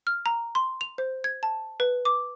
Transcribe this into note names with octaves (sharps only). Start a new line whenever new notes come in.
F6
A#5
C6
F7
C5
G#6
A5
B4
D6